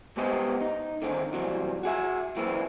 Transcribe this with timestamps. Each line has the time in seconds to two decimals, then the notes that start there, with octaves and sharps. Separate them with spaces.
0.16 C2 G#2 B3 G4 C5 D#5
0.61 D#4
1.02 D3 D#3 C4 D#4
1.33 C3 E3 F#3 G3 C4
1.83 F#4 G#4 E5
2.36 F#2 A#2 E3 A#3 C4 E4